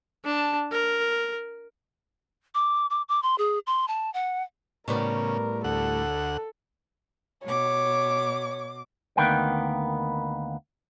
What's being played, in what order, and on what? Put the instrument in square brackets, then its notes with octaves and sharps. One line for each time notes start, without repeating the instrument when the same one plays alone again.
[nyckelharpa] D4 A5
A#4
[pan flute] D6
D6
D6
C6
G#4
C6
A5
F#5
[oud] A2 G3 B3 [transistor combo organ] C#3 [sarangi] A#4
[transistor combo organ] D2 F#5 [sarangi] A4
[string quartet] B2 D6 [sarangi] C#5
[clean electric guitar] D2 D#3 A#3 B3 G5